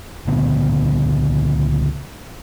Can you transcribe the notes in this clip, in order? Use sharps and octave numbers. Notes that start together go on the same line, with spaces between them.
C#2 A#2 D3 B3